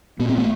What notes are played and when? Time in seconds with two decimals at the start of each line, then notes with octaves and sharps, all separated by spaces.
0.19 A#2 B3
0.29 C4
0.38 A3 B3